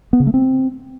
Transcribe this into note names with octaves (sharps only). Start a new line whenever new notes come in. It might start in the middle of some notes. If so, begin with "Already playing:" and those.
B3
C#3
A3
C4